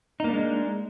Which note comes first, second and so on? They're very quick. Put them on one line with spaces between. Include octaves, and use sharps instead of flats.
D#4 A#3 D4 G#3